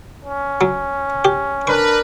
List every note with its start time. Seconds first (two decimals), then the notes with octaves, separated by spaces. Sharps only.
0.25 C#4
0.61 F#3
1.25 G4
1.67 D4 A#4 B4 C#6